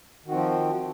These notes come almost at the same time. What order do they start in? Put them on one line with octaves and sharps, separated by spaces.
D#3 F#4 C4 F3